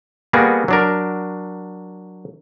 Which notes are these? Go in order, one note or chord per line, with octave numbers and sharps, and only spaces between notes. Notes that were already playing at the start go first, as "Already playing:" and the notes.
G3 A#3 B3 F#4 G#4
F#3 D4 A#4